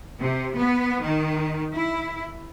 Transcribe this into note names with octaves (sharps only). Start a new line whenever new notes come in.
C3
B3
D#3
E4